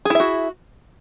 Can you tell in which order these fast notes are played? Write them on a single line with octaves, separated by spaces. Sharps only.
G#4 E4 E5 F#4